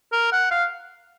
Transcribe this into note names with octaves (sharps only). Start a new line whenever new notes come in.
A#4
F#5
F5